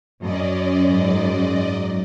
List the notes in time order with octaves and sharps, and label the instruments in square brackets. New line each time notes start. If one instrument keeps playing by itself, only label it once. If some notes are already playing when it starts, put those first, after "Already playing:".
[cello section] F#2 [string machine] C#4 D5 D#5
[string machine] G#2 D5 D#5